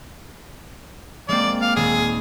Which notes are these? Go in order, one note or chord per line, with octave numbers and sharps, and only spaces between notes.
G#3 A#3 C4 D5
F5
D#1 G#4 E6